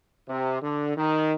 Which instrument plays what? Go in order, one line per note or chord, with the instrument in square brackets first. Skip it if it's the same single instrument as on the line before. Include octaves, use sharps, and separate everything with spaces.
[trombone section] C3
D3
D#3